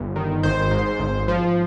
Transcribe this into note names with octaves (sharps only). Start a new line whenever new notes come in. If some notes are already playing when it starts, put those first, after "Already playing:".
Already playing: G1
D#3
G#1 C5
G#2
G#1
F3